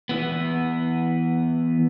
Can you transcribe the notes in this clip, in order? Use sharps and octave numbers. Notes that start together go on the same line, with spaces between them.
E3 B3